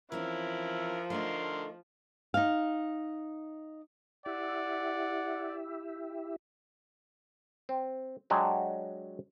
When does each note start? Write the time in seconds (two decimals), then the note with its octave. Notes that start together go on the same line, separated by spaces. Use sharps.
0.12 E3 F3 C4 C#4 E4 A#4
1.10 D3 A3 D#4 A4 A#4 C6
2.34 D#4 F5
4.26 E4 G4 D5 E5 F#5
7.69 C4
8.30 F#3 G#3 D4 F#4 G4